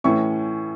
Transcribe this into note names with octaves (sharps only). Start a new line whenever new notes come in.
A2 E3 C#4 E4 C#6